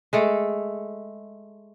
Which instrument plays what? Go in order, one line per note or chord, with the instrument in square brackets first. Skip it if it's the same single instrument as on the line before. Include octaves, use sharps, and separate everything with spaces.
[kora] G#3 A3 A4